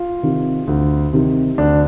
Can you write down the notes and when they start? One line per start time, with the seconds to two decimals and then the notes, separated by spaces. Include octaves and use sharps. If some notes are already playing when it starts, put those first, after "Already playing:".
Already playing: F4
0.23 C3 D#3
0.67 D2
1.13 C3 D#3
1.58 D2 D4